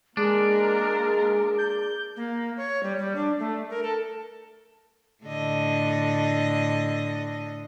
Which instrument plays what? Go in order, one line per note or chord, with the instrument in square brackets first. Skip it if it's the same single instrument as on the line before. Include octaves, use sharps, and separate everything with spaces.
[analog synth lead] G#3 [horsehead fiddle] A#3 A#4 [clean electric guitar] D4 [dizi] G#4
[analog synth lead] G6
[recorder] A#3
C#5
G3
G3
D4
A3
A#4
A4
[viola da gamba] A2 D3 D#5